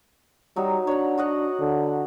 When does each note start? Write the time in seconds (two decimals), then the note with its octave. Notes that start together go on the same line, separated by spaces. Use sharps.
0.56 F#3 G3 D#4
0.87 D4 C#5 F#5
1.18 F#4 D#5 F#5
1.60 D3